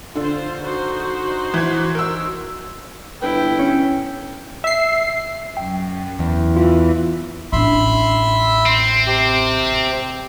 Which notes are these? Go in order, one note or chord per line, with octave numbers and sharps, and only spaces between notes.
D3 F4 C5
D#4 F#4 C5
E3 G#6
A#4 E6
G1 E4 B4 G5
C#4
E5 C7
F#2 G5
E2
E3 F4
A1 D4 E5 B5 C6
C4
C3 G4